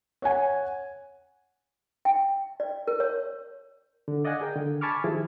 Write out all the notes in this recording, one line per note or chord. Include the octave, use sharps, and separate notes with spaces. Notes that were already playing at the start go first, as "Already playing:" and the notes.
C#5 F#5 G#5
G5
D5
A#4
C#5
D3
D5 D#5 F5 F#5 G#5
G#4 A#4 G5
D3
G#5 A5 B5 C#6 D6 F6
D#3 F3 E4 G4 G#4